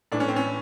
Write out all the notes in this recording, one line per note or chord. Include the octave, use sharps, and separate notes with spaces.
A2 E3 D4
C#4
C4
C#4